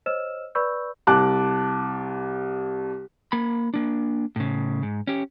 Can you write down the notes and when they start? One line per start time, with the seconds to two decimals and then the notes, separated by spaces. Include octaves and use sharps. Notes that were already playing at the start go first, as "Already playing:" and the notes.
0.06 C5 C#5 D#5 E6 F6 E7
0.55 B4 D5 B5 C#6 E6 G6
1.07 C2 A5 D6 F#6
3.32 A#3 B5
3.74 A#3 D4
4.36 A2 C#3
4.83 G#2
5.07 C#4 G4